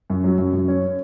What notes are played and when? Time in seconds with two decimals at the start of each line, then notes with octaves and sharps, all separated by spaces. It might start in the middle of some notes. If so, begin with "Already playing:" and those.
0.10 F#2
0.24 F#3
0.38 F#2
0.53 F#2
0.68 C#4